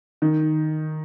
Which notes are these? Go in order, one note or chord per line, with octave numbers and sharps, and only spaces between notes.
D#3